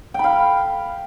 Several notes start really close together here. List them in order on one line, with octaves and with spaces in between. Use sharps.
G5 B5 F5